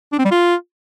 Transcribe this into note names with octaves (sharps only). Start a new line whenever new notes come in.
D4
C4
G3
F4